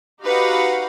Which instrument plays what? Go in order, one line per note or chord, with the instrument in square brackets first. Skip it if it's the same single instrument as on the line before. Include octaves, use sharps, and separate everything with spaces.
[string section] D#4 F#4 G4 B4 F5 F#5